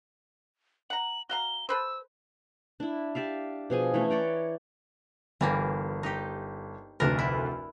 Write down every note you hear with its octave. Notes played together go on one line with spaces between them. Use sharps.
F#5 A#5 F#7
F#4 F5 A#5 G7
A4 B4 C5 E6
D4 E4
G4 D5 E5 F5
B2 F3 G#4 G#5
E3 A3 C#4
C#5 D5 G5 A#5
G1 E3 G3 A#3
D#4 G4
F1 D2 D4 A#4 B4
E4